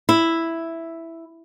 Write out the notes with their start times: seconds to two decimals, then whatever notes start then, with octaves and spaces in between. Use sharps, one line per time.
0.09 E4